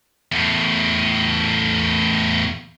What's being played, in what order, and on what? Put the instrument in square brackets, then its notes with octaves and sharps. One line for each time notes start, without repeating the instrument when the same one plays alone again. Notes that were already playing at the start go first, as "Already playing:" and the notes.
[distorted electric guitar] E2 A2